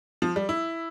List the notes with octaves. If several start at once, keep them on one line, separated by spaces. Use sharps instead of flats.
F3
G3
E4